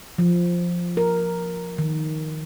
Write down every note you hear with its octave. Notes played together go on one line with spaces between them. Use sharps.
F3
A#4
D#3